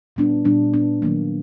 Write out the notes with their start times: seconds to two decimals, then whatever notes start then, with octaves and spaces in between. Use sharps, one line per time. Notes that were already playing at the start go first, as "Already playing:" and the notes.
0.16 A#2 G3 B3 D4
0.45 A#2 G3 B3 D4
0.73 A#2 G3 B3 D4
1.02 D#3 F#3 A#3